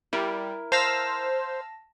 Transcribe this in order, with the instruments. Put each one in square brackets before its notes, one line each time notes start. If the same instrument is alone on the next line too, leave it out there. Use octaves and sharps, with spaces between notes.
[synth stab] G3 [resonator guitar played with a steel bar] E4 A#4
[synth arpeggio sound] C5 [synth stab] F5 E6 [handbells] A5 A#6